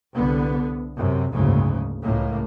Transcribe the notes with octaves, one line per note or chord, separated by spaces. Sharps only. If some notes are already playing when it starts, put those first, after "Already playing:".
C2 D3 B3
F#2 C3
F#1 D2 G#2 C#3
C#2 A2 A#3